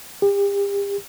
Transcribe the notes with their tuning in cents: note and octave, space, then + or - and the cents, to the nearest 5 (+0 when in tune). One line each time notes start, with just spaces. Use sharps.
G4 +35